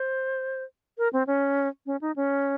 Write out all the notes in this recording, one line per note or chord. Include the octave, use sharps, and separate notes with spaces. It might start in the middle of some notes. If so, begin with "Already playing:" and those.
Already playing: C5
A#4
C4
C#4
C#4
D#4
C#4